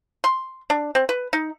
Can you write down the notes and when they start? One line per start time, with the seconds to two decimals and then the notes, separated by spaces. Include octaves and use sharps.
0.24 C6
0.70 D4
0.95 C4
1.09 B4
1.33 D#4